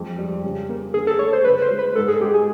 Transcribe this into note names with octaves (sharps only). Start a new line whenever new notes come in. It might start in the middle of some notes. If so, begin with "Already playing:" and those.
Already playing: F2 G#3
G3
C#3
A#3
D3 G#4
A4
A3 C#5
C5
C#3 B4
C5
G#3
B4
G#2 A4
G#4
G#3 G4
G#4